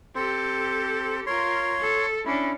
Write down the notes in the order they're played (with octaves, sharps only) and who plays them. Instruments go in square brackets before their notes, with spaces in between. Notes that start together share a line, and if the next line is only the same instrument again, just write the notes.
[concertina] C4 C5 [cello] G4 A4
[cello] F4 A#4 [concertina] C#5 C6
[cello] A4
[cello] C#4 D4 [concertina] E4